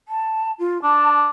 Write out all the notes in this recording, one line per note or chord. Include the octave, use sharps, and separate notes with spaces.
A5
F4
D4 A5